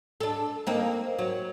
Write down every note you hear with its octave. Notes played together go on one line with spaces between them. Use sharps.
D4 A4
A#3 C4 D#4
F#3